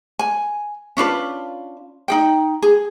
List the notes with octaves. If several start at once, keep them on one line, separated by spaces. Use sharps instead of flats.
G#5
C#4 D4 F4 B4
D#4 G#4 G5
G#4